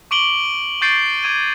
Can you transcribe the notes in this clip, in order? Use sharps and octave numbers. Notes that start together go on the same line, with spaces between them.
C#6 D6 D7 F#7 G7
C#6 D6 G6 A6 C7 D7
D6 G#6 D#7